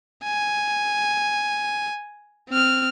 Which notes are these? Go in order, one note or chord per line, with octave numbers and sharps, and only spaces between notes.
G#5
C4 F6